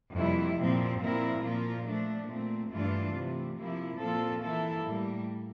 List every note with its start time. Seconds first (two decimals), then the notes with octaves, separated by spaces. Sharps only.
0.14 F2 C3 G3 A#3 E4
0.58 A#2 F3 C4
1.00 A#2 F3 C4 E4 A#4
1.42 A#2 F3 A#3 F4
1.85 F3 A3 D4
2.28 A#2 A3 C4
2.70 G2 E3 A3 D4 F4
3.14 C3 E3 A3
3.56 C3 F3 A#3 E4
3.99 A#2 F3 C4 F4 A4
4.42 E3 A#3 E4 A4
4.85 A2 G3 A#3